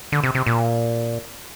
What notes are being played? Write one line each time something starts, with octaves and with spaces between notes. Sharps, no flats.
D3
C3
C3
A#2